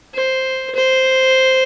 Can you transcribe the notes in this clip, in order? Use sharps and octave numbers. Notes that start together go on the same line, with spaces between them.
C5
C5